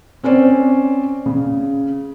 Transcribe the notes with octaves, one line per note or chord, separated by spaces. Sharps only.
C4 C#4 C5 D5
C#3